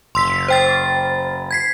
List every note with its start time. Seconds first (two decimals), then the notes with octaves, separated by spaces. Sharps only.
0.15 F#1 C6 E6 B6
0.48 C5 G5 A6
1.51 G#6 B6 C7